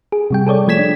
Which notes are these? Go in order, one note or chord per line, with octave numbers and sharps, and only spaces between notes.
G#4
C3 G3 G5
G#4 A4 C#5 D5
F3 A3 G#6 B6 E7
D4